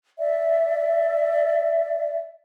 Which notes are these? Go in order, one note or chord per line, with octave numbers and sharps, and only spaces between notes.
D5 E5